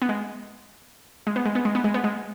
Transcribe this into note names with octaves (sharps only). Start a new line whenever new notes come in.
B3
G#3
G#3
B3
G#3
B3
G#3
B3
G#3
B3
G#3